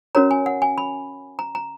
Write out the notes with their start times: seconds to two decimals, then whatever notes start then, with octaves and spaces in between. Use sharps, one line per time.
0.15 C#4 F#4 A#4 C#5 A#5
0.31 G#5
0.46 F#5
0.62 G#5
0.78 B5
1.39 A#5
1.55 A#5